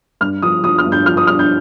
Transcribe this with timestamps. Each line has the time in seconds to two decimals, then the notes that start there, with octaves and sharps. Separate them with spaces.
0.21 G2 F6
0.42 F3 D#6
0.63 F3 D#6
0.78 F6
0.86 G2
0.92 G6
1.06 F3 F6
1.17 D#6
1.27 G2 F6
1.39 G6